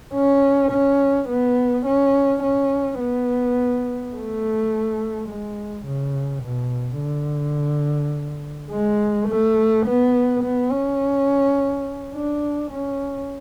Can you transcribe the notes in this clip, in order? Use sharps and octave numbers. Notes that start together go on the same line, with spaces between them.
C#4
C#4
B3
C#4
C#4
B3
A3
G#3
C#3
B2
D3
G#3
A3
B3
B3
C#4
D4
C#4